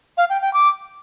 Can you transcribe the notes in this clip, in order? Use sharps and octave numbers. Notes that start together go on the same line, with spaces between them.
F5
G5
G5
D6